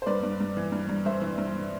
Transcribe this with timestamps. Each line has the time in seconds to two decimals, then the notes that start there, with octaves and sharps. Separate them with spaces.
0.02 C5
0.06 G2 B4 D5
0.23 G2
0.40 G2
0.57 E3
0.72 G2
0.89 G2
1.05 G2 C5 E5
1.22 E3
1.38 G2